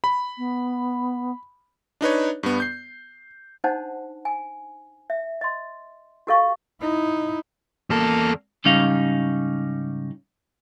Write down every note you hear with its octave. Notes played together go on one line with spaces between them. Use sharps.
B5
B3
D4 D#4 B4 C#5
G2 B3
G6 C7
D4 D#4 C5 F#5 A5
G#5
E5
D#5 C6
F#4 G4 A4 D#5 F5 C#6
D#4 E4
E2 A#3 A4
G#2 C#3 G3 C#4 D#4 F5